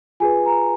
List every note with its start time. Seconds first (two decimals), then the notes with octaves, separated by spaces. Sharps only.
0.20 F4 G#4 B4 G#5
0.46 A#5